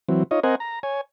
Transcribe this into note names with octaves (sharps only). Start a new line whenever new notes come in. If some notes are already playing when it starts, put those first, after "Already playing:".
E3 F#3 C4
D#4 F4 C#5 D#5
C4 A#4 C5 D#5 F#5 G#5
A#5
C#5 G#5